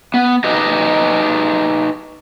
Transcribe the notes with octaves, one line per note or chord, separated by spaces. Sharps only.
B3
D#4 G4 B4 D#5